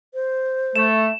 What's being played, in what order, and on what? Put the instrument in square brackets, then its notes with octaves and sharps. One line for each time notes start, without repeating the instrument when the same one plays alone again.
[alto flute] C5
[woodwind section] A3 [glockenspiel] E7